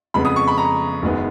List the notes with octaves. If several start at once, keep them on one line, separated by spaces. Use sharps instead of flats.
F2 C#3 G#3 B3 B5
D#6
C#6
B5
A#5
F#1 F#2 D#3 G#3 B3